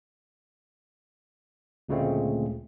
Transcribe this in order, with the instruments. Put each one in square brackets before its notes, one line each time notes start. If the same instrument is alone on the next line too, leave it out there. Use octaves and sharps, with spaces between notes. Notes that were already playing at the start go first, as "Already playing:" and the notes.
[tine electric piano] D2 A#2 C#3 G#3 A3 C4